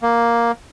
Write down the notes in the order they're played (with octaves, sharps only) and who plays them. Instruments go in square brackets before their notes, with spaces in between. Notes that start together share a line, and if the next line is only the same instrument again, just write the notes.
[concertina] A#3